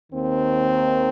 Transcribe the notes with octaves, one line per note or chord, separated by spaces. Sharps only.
D#2 D#3 A#3 C4